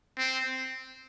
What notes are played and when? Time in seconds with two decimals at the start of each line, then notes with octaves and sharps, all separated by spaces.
0.18 C4